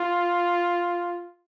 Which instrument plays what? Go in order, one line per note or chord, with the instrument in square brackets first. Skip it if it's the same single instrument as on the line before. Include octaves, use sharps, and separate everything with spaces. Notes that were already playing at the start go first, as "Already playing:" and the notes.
Already playing: [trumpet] F4